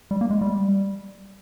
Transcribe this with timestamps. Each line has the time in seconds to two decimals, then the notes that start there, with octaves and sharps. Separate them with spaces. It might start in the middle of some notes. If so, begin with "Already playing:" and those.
0.11 G3
0.21 A#3
0.30 G#3
0.41 G3